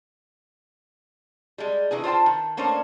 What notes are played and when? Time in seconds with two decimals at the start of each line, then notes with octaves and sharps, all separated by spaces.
1.58 G3 G#3
1.91 D#3 E3 D4 G#4
2.04 F4 C5 G5 A5
2.26 D#3
2.57 A3 A#3 C#4 D4 C5 C#5